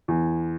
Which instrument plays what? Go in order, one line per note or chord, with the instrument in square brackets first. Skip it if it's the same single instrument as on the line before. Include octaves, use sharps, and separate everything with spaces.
[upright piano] E2